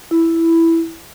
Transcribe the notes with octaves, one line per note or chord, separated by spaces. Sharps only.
E4